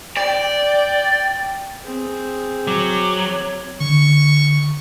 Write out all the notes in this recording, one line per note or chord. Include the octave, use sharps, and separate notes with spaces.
D5 G5
C4 G#4
F#3 D6
C#5
D3 C#6